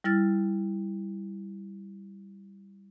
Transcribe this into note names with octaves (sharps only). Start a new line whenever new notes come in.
G3 E4 F6 A6